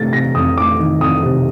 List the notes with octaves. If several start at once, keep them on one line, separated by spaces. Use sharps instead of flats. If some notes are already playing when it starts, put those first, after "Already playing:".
Already playing: C3 A3 A6
C3 A#6
F2 D#6
A3 D6
D#3
F2 D#6
C3